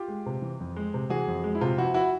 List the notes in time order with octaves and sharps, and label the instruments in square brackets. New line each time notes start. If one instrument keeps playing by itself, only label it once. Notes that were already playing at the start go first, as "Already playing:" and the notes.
Already playing: [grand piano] F4 G4
G#3
C3
E3
F2
G#3
C3
E3 F#4 G#4
F2
G#3
E4
C3 F4
F3 E4 F#4
E4 F#4